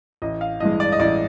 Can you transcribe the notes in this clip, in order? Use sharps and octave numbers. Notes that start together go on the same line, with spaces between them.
A1 D#5
F5
G2 E3 G#3 D#5
D5
D#5
A1 D5